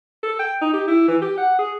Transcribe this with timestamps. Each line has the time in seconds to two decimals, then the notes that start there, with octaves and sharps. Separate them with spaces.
0.23 A4
0.39 G5
0.61 D#4
0.74 G4
0.88 E4
1.08 E3
1.22 G4
1.38 F#5
1.59 G#4